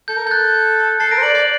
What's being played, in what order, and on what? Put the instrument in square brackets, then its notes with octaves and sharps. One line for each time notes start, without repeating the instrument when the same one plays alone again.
[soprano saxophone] A4 [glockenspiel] G6
[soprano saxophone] A#4
[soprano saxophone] A4 [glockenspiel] G6
[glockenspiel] F#6 A6
G6
[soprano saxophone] A4 [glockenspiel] A6 C7
[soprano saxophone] A#4 [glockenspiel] A#6 D7
[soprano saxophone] C5
[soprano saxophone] D5 [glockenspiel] D7 F#7
[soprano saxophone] D5 [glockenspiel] D7 F#7